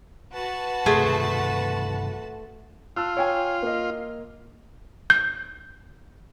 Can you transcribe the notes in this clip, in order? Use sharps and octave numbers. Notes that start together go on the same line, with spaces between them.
F#4 B4 A5
G2 C3 D#3 A3 G#4 C5
F4 A5 E6 F#6
C#5 G5 G#5
A#3 D#5
G6